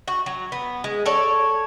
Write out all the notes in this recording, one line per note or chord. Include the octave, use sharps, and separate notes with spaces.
F#4
F#3
B3
G#3
A4 C#5 D5